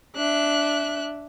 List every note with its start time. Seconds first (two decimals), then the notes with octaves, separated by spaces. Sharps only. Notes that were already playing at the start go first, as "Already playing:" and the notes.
0.16 D4 E5 F#6